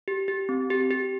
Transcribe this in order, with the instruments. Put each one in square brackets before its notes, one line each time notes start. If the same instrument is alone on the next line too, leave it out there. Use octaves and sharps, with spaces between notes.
[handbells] G4
G4
C4
G4
G4